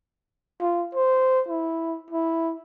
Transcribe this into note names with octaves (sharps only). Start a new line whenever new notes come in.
F4
C5
E4
E4